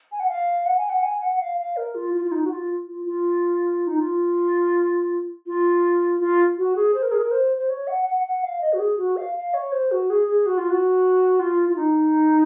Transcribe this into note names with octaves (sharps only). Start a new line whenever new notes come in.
G#5
F#5
F5
F#5
G#5
F#5
G#5
F#5
F5
F5
A#4
F4
F4
F4
D#4
F#4
F4
F4
F4
D#4
F4
F4
F4
F#4
G#4
C5
A#4
G#4
A#4
C5
C5
C#5
F#5
F#5
F#5
F5
D#5
F#4
G#4
F#4
F5
F5
C#5
C5
F#4
G#4
G#4
F#4
F4
F#4
F4
F4
D#4